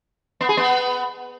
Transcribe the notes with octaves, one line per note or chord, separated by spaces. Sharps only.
B3
G#4
B3